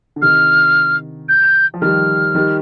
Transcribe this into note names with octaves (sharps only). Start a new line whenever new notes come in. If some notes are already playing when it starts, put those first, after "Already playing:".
D3
C3 D#3 F6
G6
F3
D#3 G3 F6
D#3 G3